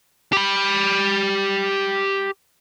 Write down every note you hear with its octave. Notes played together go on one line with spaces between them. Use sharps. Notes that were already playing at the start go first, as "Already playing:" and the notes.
G4 B5